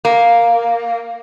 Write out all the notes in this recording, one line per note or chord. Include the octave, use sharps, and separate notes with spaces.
A#3